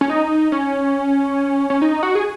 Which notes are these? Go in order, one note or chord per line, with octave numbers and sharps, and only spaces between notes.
C#4
D#4
C#4
C#4
D#4
F#4
G#4